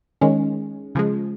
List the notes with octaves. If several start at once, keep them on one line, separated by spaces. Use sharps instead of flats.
D#3 G#3 C#4
C#3 F3 G#3